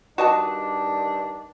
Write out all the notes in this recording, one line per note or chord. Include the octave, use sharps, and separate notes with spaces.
G2 D#3 D4 F#4 D#5 A5